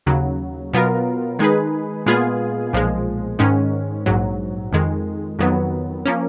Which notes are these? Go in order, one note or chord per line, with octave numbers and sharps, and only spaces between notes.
D#2 C#3 F#3
B2 F#3 B3 F4 A#4
D#3 G#3 D#4 G#4 B4
A#2 G#3 B3 F4 G#4
B1 A#2 F3 G#3
G#2 D#3 G#3 C#4
A#1 G#2 F#3
F2 D#3 G#3
F2 D#3 F#3 B3
F3 A#3 C#4